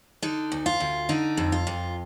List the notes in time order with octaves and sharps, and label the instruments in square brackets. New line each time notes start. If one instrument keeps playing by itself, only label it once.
[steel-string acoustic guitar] D3 D#4
D2
F4
D2
D3 D#4
F2
F4
F2